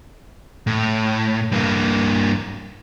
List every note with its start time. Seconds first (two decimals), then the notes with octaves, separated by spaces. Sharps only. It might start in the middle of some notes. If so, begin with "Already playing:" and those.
0.67 A2
1.52 G2 A#3